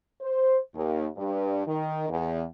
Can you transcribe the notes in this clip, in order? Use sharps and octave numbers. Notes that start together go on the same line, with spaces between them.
C5
D#2
G2
D#3
E2